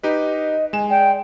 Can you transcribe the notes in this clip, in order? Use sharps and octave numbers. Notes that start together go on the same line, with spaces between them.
D#4 G4 B4 D#5
G#3 G#5 E7
D5 G5